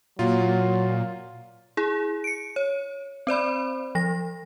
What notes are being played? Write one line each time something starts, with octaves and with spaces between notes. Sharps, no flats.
A#2 F#3 F4
E4 G#4
C#7 D7
C#5
C4 C5 D5 B5
F3 A#6